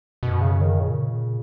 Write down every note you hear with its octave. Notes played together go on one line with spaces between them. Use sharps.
F#2 B2
C#3
D#3
A#2 C#3